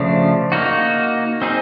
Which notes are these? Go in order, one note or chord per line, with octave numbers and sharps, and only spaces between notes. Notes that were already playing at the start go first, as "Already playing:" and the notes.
Already playing: C#3 F3 A3 D4
A#3 D#4 F#4
C4 D#4 G#4